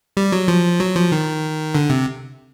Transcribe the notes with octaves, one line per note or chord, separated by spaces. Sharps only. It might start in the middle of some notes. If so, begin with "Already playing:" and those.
G3
F#3
F3
F#3
F3
D#3
D3
C3